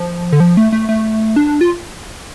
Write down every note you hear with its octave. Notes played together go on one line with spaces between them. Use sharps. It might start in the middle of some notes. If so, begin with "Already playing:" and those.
Already playing: F3
D3
F3
A3
A3
A3
D4
F4